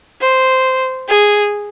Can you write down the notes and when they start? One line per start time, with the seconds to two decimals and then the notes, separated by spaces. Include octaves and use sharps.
0.21 C5
1.08 G#4